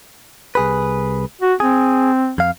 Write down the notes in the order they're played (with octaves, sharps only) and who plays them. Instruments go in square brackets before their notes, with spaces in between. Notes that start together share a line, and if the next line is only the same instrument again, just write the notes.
[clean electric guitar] C2 G#4 B4
[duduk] F#4
[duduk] C4 [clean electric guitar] G#4
[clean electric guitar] F2 F5